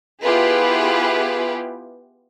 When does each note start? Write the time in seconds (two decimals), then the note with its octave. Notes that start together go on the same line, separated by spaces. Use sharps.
0.22 B3 E4 F4 G4 G#4 B4